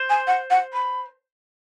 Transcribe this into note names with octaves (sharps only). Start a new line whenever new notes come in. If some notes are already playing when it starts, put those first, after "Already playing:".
Already playing: C5
G#5
F#5
F#5
B5